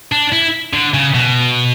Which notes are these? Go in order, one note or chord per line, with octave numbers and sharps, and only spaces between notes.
D4
E4
D3
C#3
B2